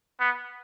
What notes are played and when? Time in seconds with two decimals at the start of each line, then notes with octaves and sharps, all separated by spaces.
0.20 B3